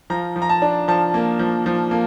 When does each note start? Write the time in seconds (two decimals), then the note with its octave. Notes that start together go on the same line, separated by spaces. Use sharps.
0.10 F3 A#5
0.36 F3
0.42 A#5
0.49 A5
0.62 D4
0.88 F3 A5
1.14 A#3
1.39 F3
1.66 F3
1.91 A#3